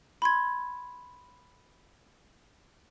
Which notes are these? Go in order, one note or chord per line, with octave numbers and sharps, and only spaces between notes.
B5 C6 G#6